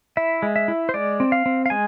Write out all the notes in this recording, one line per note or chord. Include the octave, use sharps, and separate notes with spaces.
E4 E5
G#3
E5
E4
C5
G#3 D5
C4
F5
C4
F5
G#3 G#5